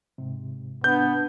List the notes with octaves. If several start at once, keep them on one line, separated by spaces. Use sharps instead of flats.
G#2 C3
B3 D4 G6